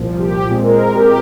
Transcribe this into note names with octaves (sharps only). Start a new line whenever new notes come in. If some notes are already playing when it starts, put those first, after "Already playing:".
Already playing: C2 A#2 F3
G4
A#2 G#3 C4 G#4
A#4
G4